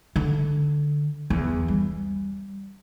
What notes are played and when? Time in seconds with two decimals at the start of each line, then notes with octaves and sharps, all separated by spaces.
0.16 D3
1.30 E2
1.68 G3